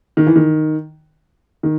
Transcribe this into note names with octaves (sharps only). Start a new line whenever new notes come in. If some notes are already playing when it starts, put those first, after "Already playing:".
D#3
E3
D#3
D#3